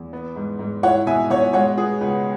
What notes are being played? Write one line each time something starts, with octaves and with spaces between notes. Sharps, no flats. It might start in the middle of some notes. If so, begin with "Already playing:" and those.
Already playing: E2
B3
G#2
G#2
E4 C#5 F#5
B2 E5 G#5
B2 C#5 F#5
G#3 C#5 F#5
B3 G#4
C#2 B4